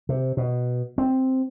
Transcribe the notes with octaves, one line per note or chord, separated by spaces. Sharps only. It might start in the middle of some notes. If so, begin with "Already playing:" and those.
C3
B2
C4